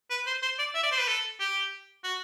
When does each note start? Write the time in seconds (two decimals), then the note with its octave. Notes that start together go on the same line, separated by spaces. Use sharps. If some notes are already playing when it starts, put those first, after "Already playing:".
0.10 B4
0.27 C5
0.43 C5
0.59 D5
0.74 E5
0.83 D5
0.92 C5
1.00 B4
1.08 A4
1.40 G4
2.04 F#4